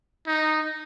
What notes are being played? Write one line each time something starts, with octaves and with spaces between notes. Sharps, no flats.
D#4